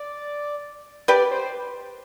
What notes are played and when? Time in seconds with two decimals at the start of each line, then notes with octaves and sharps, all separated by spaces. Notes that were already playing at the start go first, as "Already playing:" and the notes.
Already playing: D5
1.08 G4 B4 D5
1.31 C5